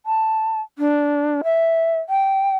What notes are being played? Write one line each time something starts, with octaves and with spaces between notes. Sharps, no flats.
A5
D4
E5
G5